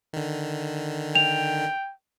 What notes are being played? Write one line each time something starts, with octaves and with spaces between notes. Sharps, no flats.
D3 D#3
G5 F7